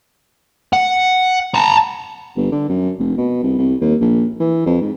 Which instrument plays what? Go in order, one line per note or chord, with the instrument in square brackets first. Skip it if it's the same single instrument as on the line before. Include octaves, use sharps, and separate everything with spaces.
[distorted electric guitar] F#5
A5 A#5
[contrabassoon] G1
D3
F#2
F1
B2
C2
C2
D#2
A#1
E3
F2
G#2